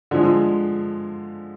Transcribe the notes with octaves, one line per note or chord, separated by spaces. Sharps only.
D3 F3 G#3